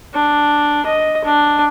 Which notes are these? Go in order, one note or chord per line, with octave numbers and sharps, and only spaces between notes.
D4
D#5
D4